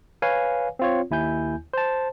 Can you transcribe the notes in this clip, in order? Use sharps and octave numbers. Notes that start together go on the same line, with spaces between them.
B4 C#5 F5 G#5
C4 F4 C#5
D#2 E4 G#5 G6
C5 A5